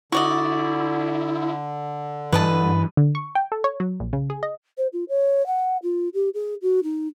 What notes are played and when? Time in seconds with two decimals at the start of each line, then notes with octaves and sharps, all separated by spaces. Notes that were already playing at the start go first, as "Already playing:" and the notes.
0.12 D3 E4 F#4 D5 D#5
2.32 G2 E3 B4 D#5 A5
2.97 D3
3.15 C#6
3.35 G5
3.52 A4
3.64 C#5
3.80 F#3
4.00 A#1
4.13 C#3
4.30 G#4
4.43 D#5
4.77 C5
4.93 F4
5.09 C#5
5.46 F#5
5.82 F4
6.14 G4
6.34 G#4
6.62 F#4
6.83 D#4